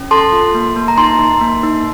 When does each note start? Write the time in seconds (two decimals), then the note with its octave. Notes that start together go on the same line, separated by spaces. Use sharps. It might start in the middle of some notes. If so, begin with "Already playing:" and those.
Already playing: C#4
0.11 A4 A5 C6
0.32 F4
0.54 A#3
0.76 A#3
0.88 A#5
0.98 D#4 A5 C6
1.19 D#4
1.41 A#3
1.63 D#4